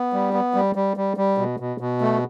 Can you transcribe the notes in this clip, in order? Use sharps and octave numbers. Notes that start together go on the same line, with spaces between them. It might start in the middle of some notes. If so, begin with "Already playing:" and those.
Already playing: B3
G3
B3
G3
G3
G3
G3
B2
B2
B2
A3